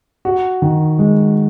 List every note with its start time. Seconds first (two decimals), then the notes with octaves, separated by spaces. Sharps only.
0.25 F#4
0.62 D#3
0.99 G#3